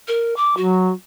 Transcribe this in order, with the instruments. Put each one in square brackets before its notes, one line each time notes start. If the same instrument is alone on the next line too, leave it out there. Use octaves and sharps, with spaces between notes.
[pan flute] A#4
D6
[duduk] F#3 [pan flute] F#4